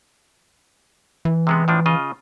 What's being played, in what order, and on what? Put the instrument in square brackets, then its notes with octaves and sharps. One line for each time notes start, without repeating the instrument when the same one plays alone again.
[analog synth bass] E3
[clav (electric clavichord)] C3 G#3 B3
A2 F3 D4
C#3 F4 D#5